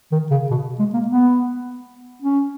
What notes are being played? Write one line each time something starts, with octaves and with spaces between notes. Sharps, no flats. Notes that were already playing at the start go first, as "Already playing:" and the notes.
D#3
C#3
B2
G#3
A#3
B3
C#4